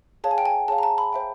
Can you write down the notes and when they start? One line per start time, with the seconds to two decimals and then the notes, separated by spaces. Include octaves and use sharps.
0.24 G#4 C#5 F5 A5
0.31 G#5
0.38 G5
0.46 G#5
0.68 G#4 C#5 F5 A5
0.78 A#5
0.83 A5
0.98 B5
1.13 C5 E5 G5